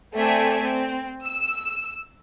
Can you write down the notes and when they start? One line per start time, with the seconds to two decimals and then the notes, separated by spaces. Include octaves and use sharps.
0.14 A3 C4 D5 E5 G#5
0.64 C4
1.25 E6